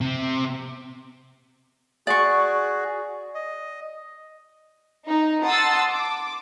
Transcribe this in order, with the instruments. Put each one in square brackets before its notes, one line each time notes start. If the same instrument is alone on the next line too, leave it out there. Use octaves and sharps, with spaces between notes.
[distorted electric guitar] C3
[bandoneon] F#4 G#4 [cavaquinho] D5 C#6
[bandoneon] D#5
[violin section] D#4
F#5 A5 C6 D#6 E6 A6
D6